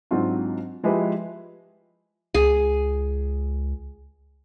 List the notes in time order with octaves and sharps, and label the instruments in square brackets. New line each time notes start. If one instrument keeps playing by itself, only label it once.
[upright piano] G#2 F#3 C4 D4 F4 F#4
F3 G#3 E4 G4 B4
[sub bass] C#2 [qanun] G#4